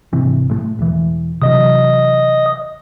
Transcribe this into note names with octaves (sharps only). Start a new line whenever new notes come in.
G#1 C3 E3
A2 G#3 A3
E1 E3
C3 E3 F#3 D#5 D#6